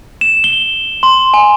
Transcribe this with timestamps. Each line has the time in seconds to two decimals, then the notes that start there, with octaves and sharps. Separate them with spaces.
0.21 E7
0.44 G7
1.03 C6
1.34 G#5